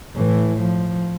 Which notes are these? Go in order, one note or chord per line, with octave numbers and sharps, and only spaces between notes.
A2 E3
F3